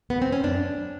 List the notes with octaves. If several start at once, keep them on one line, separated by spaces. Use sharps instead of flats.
B3
C4
C#4
F#2 D4